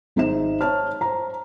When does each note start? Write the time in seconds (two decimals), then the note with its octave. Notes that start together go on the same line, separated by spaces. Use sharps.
0.16 G#1 G#3 D#4 C5 E5 E7
0.61 C5 C#5 A5 F6
1.01 C5 A#5